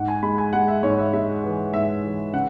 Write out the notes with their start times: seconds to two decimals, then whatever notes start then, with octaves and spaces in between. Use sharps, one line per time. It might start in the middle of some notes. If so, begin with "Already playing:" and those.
Already playing: G#2 F#5
0.08 G#5
0.23 G#3 B5
0.38 G#5
0.53 G#3 F#5
0.68 E5
0.83 G#2 C#5
0.98 E5
1.13 G#3 E5
1.44 E3
1.74 G#2 E5
2.04 E3
2.33 C#3 F#5